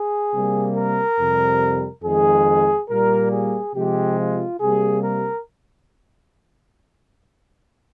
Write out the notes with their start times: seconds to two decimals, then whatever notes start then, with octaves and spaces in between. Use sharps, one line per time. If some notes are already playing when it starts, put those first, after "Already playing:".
Already playing: G#4
0.34 C3 G3 A#3
0.76 A#4
1.19 F2 C3 G3
2.04 F2 D#3 G#3 G#4
2.89 A#2 G3 A#3 A#4
3.33 G#4
3.75 C3 F3 G#3 G4
4.18 F4
4.60 C3 G3 A#3 G#4
5.03 A#4